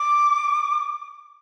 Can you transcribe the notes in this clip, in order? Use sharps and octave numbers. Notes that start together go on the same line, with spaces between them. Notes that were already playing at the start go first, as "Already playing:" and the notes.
Already playing: D6